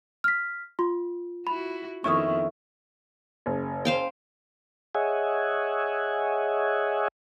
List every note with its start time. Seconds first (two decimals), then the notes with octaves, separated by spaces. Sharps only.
0.24 F6 B6
0.79 F4 C6
1.47 E4 F#4 B5
2.04 F2 D#3 B3 C#4 E4 E5 C#6 D#6
3.46 F#1
3.85 C5 F5 G5
4.95 G#4 C#5 D#5 E5 F#5 G#5